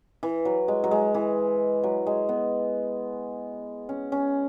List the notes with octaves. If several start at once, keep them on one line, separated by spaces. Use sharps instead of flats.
E3
F#3
G#3
F#3
G#3
E3
F#3
G#3
B3
C#4
C#4